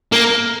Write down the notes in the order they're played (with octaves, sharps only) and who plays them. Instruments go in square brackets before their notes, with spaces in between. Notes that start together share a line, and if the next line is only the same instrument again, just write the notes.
[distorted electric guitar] A#3